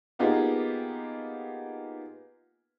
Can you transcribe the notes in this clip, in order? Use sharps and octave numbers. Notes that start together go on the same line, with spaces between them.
A#3 B3 D#4 F4 G4 G#4